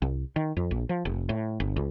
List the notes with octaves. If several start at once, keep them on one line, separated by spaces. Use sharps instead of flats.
C2
D#3
F2
A#1
F3
F1
A2
G1
C#2